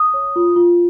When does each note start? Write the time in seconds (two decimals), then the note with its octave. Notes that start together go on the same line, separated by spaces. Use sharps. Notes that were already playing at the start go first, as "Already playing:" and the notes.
Already playing: D#6
0.14 C#5
0.36 F4
0.56 F4